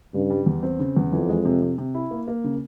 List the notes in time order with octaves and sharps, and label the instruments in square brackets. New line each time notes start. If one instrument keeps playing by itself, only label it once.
[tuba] G2 [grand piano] C#3
[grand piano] G3
E2
C4
C#3
E2
[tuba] F2 [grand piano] E3
[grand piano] G#3
C3
C3
C3
E4
A#3
A#3
C#3